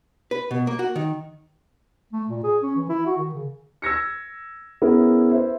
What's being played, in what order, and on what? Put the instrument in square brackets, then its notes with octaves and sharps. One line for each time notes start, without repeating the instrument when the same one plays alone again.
[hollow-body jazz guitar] B4
B2
A#3
F#4
D#3
[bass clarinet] A3
A#2
G#4
C#4
E3
E4
F#4
D#3
C#3
[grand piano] E6 G#6 A#6 C#7
B3 C#4 E4 G#4 A#4 B4
B4 C5 E5